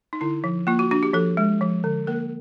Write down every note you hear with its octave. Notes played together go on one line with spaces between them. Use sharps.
D#4
D3 E4
F3
A#3 F4
F#4
D4 F#4
G4
F3 A4
G#3
F3
D3
A#3 A#4